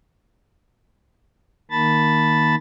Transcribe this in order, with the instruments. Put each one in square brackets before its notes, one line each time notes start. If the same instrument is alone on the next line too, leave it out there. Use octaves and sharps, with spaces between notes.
[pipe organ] D#3 A#3 A5 B5 A6